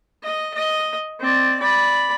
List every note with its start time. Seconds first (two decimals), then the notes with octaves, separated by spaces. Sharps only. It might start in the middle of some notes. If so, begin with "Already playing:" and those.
0.23 D#5
0.54 D#5
1.20 C4 D5
1.60 D5 B5